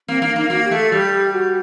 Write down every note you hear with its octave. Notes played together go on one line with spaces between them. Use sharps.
A#3 C4
A#3 D4
A#3 D#4
A#3 F#4
G4
A3
A4
G3 G4
F#4